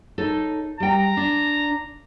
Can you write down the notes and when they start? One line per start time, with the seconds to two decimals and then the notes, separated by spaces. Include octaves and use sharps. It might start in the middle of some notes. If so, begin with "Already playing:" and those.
0.18 D#4 A4 C#5
0.80 G3 G5 A#5
1.17 D4